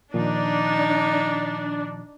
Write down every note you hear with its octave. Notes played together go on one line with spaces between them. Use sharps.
A#2 D#3 F3 D4 D#4